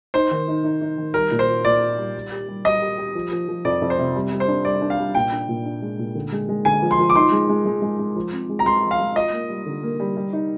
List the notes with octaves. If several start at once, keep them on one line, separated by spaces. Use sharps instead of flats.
D#4 C5
D#3
D#4
D#4
D#4
D#3
G3 A#4
A#2
C5
F4
A#2 D5
F4
G3
G3
G4
G3
G3 D#5
G4
G4
F3
F3
F3
F2 D5
F2
C5
C3
G3
G3
C5
D4
G3 D5
D4
F5
G3
A#2 G5
D4
A#2
D4
G#3
A#2
D3
G#3
G#3
D3 G#5
F3
C6
F3
D6
D#4 C6
G#3
G#3
G#3
G#3
G#3
F3
C4
G#3
A#5
G#3 C6
F3
F5
G#3
F4 D#5
A#3
G3
D3
A#3
G3
G3
D#4